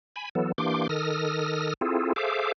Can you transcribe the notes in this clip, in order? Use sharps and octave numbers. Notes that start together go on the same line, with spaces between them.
G#5 B5
E3 F#3 B3 A4
E3 A#3 D4 G4 C6 D6
D#3 A4 D#6 F6 A#6
C4 E4 F4 G#4 A4
G#4 A4 C5 E5 F5 D6